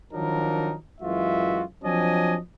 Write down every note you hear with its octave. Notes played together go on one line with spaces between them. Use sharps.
D#3 F3 F#3 D4 D#4 A#4
F#2 E3 G#3 F4 F#4 E5
F3 F#3 C4 D4 D#5 G#5